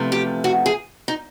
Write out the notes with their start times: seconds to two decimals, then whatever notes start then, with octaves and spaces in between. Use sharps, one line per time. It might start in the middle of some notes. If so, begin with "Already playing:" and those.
Already playing: E2 C3 F3 A3
0.12 G4
0.44 F#4
0.66 G#4
1.08 D#4